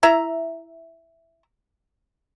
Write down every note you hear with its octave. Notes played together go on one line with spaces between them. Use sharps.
E4 E5 A#5